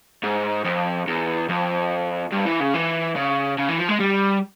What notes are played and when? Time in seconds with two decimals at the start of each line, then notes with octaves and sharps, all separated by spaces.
0.23 G#2
0.65 F2
1.07 E2
1.49 F2
2.32 G2
2.46 E3
2.60 C#3
2.74 E3
3.16 C#3
3.58 C#3
3.69 E3
3.78 F3
3.89 G#3
4.00 G3